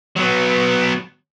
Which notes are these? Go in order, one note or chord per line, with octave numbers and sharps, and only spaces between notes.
F#3 B3